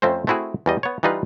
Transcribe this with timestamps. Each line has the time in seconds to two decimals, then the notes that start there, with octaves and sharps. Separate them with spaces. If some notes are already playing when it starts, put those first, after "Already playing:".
0.02 F2 A3 C4 C#4 C5
0.27 A3 C4 E4 F#4 G#4
0.66 E2 G3 D#5
0.83 B3 C#5
1.03 E3 G3 D#4 F4 B4